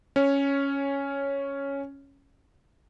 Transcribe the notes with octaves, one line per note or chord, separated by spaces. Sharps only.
C#4 C#5